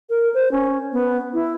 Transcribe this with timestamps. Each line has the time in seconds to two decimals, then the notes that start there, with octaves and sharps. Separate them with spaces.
0.10 A#4
0.34 C5
0.52 C#4
0.92 B3
1.33 E4